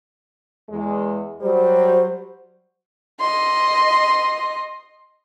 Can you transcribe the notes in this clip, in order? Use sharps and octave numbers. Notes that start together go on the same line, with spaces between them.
E2 G#3
F#3 G3 C5
D#5 C6